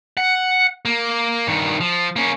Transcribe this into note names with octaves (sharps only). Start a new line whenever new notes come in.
F#5
A#3
G2 D#3
F3
A#3 C#4